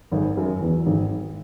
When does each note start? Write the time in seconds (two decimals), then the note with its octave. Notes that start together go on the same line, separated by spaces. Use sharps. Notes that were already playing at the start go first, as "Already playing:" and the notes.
0.12 G#1 G#2
0.37 F#2
0.61 E2
0.86 G#1 G#2